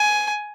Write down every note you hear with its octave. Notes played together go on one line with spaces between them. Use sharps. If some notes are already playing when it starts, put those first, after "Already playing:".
Already playing: G#5